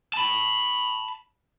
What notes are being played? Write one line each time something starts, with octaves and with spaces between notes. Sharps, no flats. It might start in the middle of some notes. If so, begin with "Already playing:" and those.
A5 B5